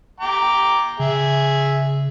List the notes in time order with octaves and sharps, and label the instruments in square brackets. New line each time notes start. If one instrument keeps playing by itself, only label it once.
[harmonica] G5 A#5 D6
[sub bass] C#3 [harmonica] G#4 E5